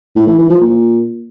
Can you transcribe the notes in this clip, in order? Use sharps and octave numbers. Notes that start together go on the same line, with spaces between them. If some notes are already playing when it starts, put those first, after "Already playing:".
A2
E3
E3
F3
A#2